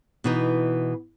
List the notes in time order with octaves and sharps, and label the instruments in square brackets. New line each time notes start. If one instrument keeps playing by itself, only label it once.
[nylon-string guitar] B2 E3 D#4